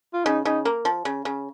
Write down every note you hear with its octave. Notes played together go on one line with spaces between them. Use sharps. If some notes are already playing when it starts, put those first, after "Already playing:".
F4
C#3 D#4
C#3 D#4
A#3
F3
C#3
C#3